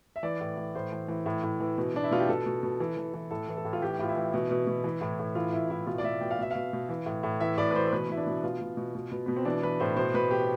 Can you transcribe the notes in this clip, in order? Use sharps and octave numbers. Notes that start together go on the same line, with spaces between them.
E5
E3 D5
A2
E3
A2 C5
E3
E3
A2
A2
E3
B2
B2 D4
E4
B2 F4
G4
B2 A4
B2
B2
E3
E3
E3
A2 A4
E3
A4
A2
F4
E3 G4
A2 F4
E4
E3
B2
B2
B2
E3
A2
A2
E3 F4
A2 E4
A2 E4
B2 F4
D5
B2 E5
B2 G5
F5
B2 E5
B2 F5
B2
E3
A2
A2
E3 E5
A2 D5
B4
E3 C5
C5
B2 B4
B2 E4
D4
B2
B2 F4
B2
B2
B2
B2
B2 B3
C4
E3 D4
E3 B4
A2 C5
B2 C5
B2 B4
B2 G4